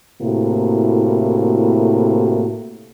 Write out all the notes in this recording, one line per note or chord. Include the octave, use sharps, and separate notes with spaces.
A2 C3 A#3 E4 F#4